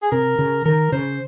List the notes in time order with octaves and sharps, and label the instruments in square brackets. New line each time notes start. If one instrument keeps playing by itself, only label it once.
[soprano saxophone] G#4
[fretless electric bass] C3 [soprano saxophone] A#4
[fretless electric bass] C#3
[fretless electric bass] D#3 [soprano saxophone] A#4
[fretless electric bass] C#3 [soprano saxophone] C5